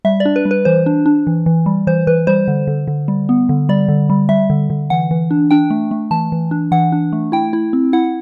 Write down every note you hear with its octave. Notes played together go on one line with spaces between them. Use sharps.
G3 E5
D5
D4
B4
G3
B4
E3 C5
D4
D4
E3
E3
G3
E3 C5
E3 B4
G3 C5
D3
D3
D3
G3
B3
D3
G3 D5
D3
G3
G3 E5
D3
D3
E3 F#5
E3
D4
D4 G5
A3
A3
E3 A5
E3
D4
E3 F#5
D4
A3
E4 G5
E4
C4
E4 F#5